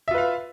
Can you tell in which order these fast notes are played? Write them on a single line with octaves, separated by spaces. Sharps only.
E5 F4 B4 F5